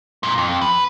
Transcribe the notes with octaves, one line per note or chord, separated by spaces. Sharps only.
F2 A#2
F2
B4